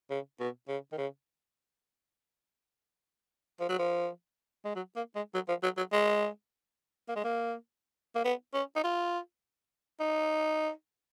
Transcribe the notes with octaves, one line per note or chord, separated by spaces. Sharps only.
C#3
B2
C#3
D#3
C#3
F3
F#3
F3
G#3
F#3
A#3
G#3
F#3
F3
F#3
F#3
G#3
A#3
G#3
A#3
A#3
B3
C#4
D#4
F4
D#4